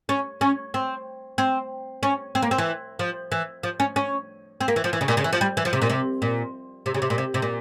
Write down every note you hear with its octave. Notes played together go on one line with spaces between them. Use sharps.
C#4
C#4
C4
C4
C#4
C4
A#3
C4
E3
F3
E3
F3
C#4
C#4
C4
A#3
E3
F3
E3
C#3
A#2
C#3
E3
F3
G3
E3
F3
C3
A#2
C3
A#2
C3
C#3
C3
A#2
C3
C3
A#2